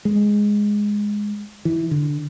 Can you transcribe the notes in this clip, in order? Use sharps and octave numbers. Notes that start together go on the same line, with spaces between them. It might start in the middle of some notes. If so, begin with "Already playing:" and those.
G#3
E3
D3